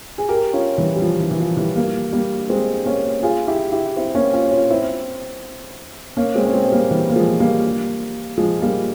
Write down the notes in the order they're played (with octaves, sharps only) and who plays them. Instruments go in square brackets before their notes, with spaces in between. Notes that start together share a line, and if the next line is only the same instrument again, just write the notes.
[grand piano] G#4
G4 A#4
C#4 F4
E3 G3
G3
F3
E3
E3
F3
E3 G3
G3 A#3
G3 A#3
G#3 C4
A#3 C#4
F4 G#4
E4 G4
E4 G4
C4 E4
A#3 C#4
C#4 F4
C#4 F4
C4 E4
A#3 C#4
G#3 C4
C#4
G#3 C4
C4
G3 A#3
E3 G3
A#3
F3 G#3
G3 A#3
F3 G#3
G3 A#3